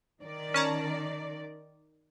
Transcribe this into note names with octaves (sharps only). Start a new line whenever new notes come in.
D#3 D5
C#4 A5 A#5